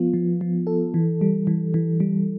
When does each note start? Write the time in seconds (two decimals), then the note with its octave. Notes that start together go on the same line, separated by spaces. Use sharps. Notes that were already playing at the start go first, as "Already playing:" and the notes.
Already playing: F3 B3 F4
0.14 F3
0.41 F3
0.67 A4
0.94 E3
1.21 G3
1.47 E3
1.74 E3
2.00 G3